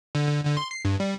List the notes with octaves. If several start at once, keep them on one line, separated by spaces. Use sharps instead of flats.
D3
D3
D3
C6
C7
G2
G3